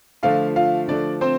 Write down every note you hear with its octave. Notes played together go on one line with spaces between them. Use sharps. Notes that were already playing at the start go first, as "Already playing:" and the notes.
D3 F3 A3 F4 F5
F4 F5
D3 F3 A3 D4 D5
C4 C5